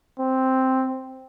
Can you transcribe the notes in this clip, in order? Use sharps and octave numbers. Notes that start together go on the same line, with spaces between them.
C4